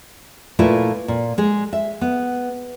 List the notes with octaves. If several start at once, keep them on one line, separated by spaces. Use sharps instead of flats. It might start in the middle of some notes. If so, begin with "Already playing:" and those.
A#2 A3 E4 F4 B4
A#2
G#3 G#4
E5
B3